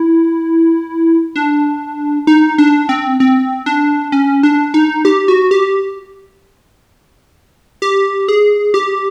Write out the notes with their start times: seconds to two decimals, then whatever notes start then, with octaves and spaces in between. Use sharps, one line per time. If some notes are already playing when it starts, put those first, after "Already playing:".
Already playing: E4
1.36 D4
2.27 D#4
2.58 D4
2.89 C4
3.20 C4
3.66 D4
4.12 C#4
4.43 D4
4.74 D#4
5.05 G4
5.28 F#4
5.51 G4
7.82 G4
8.28 G#4
8.74 G4